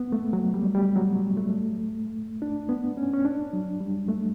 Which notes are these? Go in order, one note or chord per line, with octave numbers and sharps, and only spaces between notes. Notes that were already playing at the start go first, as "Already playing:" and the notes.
Already playing: B3
A3
F#3
G3
G3
F#3
A3
D4
B3
C#4
C#4
D4
F#3
G3
A3